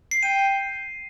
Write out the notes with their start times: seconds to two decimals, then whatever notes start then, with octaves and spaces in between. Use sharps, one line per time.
0.11 C7
0.23 G5 D#7